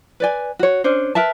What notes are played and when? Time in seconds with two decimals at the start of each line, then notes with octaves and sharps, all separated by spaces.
0.20 B4 D5 G#5
0.59 F#4 C#5
0.84 C#4 D4 C5
1.15 A#4 B4 E5 A5